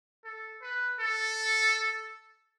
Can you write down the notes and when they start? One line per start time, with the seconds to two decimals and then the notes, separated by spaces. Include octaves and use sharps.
0.25 A4
0.62 B4
1.00 A4